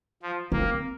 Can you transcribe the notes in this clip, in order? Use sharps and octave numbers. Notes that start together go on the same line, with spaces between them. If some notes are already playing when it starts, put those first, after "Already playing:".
F3
A#3 C4